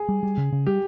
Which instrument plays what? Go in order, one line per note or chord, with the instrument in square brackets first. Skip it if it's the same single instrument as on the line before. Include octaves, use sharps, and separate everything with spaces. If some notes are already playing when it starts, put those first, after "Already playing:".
Already playing: [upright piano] G#4
[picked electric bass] G3
G3
C#3
C#3
[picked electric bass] G3 [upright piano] G4